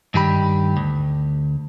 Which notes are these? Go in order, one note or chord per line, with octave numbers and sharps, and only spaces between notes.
G2 D#3 G4 B5
D2